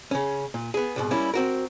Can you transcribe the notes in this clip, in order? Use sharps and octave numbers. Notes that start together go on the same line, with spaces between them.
C#3 C#4
A#2
B3 G#4
C2 G#2 B2
G3 A#3 C#4 E4
C4 F#4 A#4